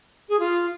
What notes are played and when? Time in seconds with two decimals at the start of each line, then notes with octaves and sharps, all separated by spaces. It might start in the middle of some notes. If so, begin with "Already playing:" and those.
0.29 G#4
0.39 F4